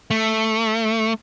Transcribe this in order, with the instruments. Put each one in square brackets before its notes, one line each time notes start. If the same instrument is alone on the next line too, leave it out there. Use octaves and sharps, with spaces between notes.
[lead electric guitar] A3